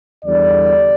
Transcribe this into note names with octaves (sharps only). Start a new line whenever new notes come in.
E2 D3 G3 D5